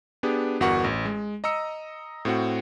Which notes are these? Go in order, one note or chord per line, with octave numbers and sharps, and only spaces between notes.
B3 D4 G4 G#4
G1 E2 F#4 A#4 F#5 C#6
A1
G#3
D#5 A#5 D#6 E6 C#7
A2 C4 F#4 F#5